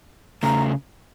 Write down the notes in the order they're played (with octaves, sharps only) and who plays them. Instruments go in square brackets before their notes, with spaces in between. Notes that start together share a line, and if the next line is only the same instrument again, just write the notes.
[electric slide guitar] C#3 A3 [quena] A#5